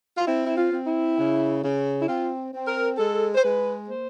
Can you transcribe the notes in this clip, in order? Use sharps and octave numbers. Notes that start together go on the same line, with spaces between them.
F4
C4 E4
E4
F4
C4
E4
C#3
C#3
E4
C4 F4
C4
A#4
G#3 A4
C5
G#3 B4
A#3 C5